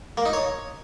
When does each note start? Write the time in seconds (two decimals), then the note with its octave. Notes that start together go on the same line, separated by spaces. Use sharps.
0.17 A#3
0.25 D#4
0.33 C#5